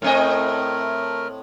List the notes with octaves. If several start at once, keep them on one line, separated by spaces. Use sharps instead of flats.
A2 A3 C4 A#4 D#5